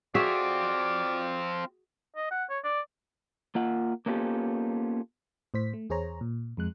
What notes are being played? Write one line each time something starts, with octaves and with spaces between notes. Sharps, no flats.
C4 F4 F#4 G#4 D5 E5
D#5
F#5
C#5
D5
A#3 F4 F#5
A#3 B3 C#4 F4 G4 A4
A2 C5 B6
A3
E2 G#4 C5 C#5 A#5
A#2
F2 G#3 F#6